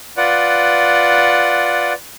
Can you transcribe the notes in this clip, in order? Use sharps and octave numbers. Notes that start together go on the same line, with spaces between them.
F4 B4 D5 F#5